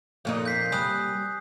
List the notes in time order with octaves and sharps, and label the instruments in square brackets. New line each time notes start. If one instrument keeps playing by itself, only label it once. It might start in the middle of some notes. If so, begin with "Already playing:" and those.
[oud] F2 A#2 D#4
[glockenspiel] G6 B6 C7
[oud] G3 [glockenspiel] G#5 D#6 F#6